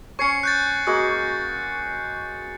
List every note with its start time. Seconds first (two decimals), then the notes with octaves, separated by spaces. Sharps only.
0.19 C#4 C#5 C#6 C7 C#7
0.43 F#6 G6 A6
0.87 G#3 A#3 F#4